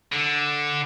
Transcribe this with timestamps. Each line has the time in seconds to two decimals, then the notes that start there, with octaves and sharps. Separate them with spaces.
0.12 D3